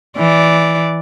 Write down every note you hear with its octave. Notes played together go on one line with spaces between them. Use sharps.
E3 D5